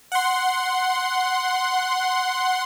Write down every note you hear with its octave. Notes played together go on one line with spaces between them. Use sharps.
F#5 C6